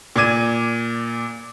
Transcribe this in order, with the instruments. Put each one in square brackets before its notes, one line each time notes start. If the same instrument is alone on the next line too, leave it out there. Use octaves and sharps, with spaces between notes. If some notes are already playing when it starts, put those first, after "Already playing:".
[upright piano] A#2 D5 D6 G#6 D#7